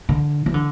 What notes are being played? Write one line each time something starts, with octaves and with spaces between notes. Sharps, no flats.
D3
E3
D3